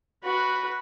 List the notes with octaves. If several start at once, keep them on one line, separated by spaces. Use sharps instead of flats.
F#4 B4